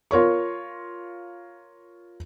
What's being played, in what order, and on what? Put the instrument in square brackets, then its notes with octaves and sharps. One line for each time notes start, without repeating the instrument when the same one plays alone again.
[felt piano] F4 A#4 C#5 C#6